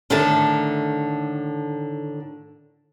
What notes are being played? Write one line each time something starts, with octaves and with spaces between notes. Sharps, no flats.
A2 D3 D#3 A3 A4 A5